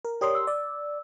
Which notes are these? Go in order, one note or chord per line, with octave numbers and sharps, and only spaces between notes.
A#4
G4 A#4 C#5 D5 C6 D#6
E6
D5